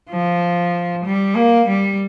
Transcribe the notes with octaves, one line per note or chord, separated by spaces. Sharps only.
F3
G3
A#3
G3